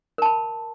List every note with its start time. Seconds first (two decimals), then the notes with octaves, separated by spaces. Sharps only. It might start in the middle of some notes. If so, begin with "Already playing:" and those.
0.18 A#4
0.22 A5
0.26 B5